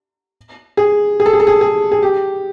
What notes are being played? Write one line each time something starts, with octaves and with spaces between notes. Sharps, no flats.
G#4
G#4
A4
G#4
A4
G#4
G#4
G#4
G4